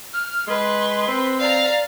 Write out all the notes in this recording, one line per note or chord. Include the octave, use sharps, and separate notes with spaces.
F6
G#3 B4 C6
C4
D5 F5 A#5